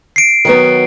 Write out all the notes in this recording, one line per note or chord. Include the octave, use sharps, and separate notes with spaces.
C7 D7
D#3 F#3 B3